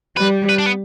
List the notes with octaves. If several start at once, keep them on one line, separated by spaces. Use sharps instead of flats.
G3 B4
B4
D4
B3